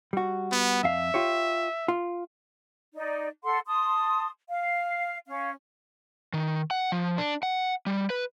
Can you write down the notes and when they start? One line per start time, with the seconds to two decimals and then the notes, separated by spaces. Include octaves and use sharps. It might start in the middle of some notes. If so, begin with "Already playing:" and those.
0.13 G3 F#4
0.52 B3
0.84 F2 E5 F5
1.14 F4 G4 C#5
1.88 F4
2.94 D#4 D5
3.44 A4 F#5 C6
3.67 A5 C6 D#6
4.49 F5
5.27 C#4 F5
6.33 D#3
6.71 F#5
6.92 F3
7.18 D4
7.43 F#5
7.86 G3
8.10 B4